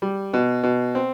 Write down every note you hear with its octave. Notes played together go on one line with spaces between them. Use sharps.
G3
B2
B2
C4